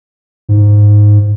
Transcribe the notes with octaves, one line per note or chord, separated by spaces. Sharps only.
G#2